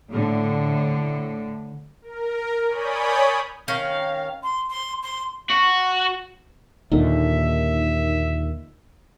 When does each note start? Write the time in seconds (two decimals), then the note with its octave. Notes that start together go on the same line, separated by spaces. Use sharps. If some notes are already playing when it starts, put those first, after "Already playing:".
0.10 A2 D3
2.02 A#4
2.68 C#5 D5 G#5 B5 D#6 G6
3.68 D#3 C#4 F5 G5
4.43 C6
4.70 C6
5.03 C6
5.50 F#4
6.92 D#2 A#2 D3 D#4 E5